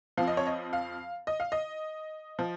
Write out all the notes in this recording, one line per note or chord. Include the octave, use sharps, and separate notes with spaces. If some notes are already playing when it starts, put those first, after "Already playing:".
F2 F3 F5
D#5
C#5
D#5
F5
D#5
F5
D#5
F3